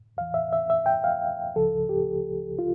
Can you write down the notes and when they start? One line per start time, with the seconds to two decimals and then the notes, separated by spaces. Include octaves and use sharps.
0.17 E2 E3 F5
0.34 E5
0.53 E5
0.70 E5
0.86 G5
1.04 F5
1.56 C#2 C#3 F3 A4
1.89 G4
2.59 F4